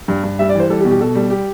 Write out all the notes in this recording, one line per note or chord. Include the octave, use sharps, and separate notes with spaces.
G2
G2
G3 E5
D5
E3 C5
G3 A4
G4
B2
G4
B2 A4
G3
G4